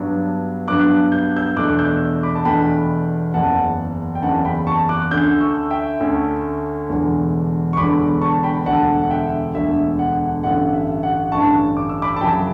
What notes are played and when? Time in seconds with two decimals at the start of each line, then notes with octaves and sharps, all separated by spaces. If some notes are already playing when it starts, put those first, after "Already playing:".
Already playing: G2 F#3 B3 D4
0.68 G2 F#3 B3 D4 D6 F#6
1.12 G6
1.36 E6 G6
1.56 E2 B2 A3 D4 D6 F#6
1.79 E6 G6
2.23 B5 D6
2.35 A5
2.45 E2 B2 A3 D4 G5 B5
3.34 F#1 E2 C#3 F#5 A5
4.15 G5
4.22 F#1 E2 C#3 F#5 A5
4.45 G5 B5
4.67 A5 C#6
4.89 D6 F#6
5.11 D2 D3 A3 C#4 E6 G6
5.41 C#6 E6
5.70 E5 G5
6.00 D2 D3 A3 C#4
6.89 E1 E2 D3
7.73 C#6
7.77 E1 E2 D3 B5 D6
8.21 A5 C#6
8.43 G5 B5
8.66 E1 D2 D3 F#5 A5
9.02 F#5
9.10 E5 G5
9.55 E1 D2 D3 E5
9.99 F#5
10.44 A1 G2 D3 F#5
10.73 E5
11.03 F#5
11.32 A1 G2 D3 A5 C#6
11.77 D6
11.89 E6
12.02 B5 D6
12.16 A5
12.21 F#2 C#3 F#3 G5 B5